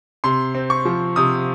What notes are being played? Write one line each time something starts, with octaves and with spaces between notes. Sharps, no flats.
C3 C6
C4
C#6
F3
C3 D#6